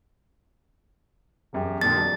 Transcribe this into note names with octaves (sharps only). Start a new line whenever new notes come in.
E1 F#2 G4
F2 A#2 D3 A6
E1 F#3 D4